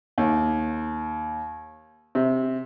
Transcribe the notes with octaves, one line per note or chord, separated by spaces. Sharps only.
D#2
C3